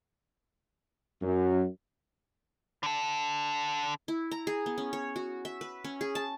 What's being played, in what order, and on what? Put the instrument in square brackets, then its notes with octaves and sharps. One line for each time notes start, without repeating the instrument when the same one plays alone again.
[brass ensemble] F#2
[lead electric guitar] D3 A4
[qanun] E4
A#5
G#4
B3
C#4
C#5
F#4
E5
B4
C#4
G#4
A5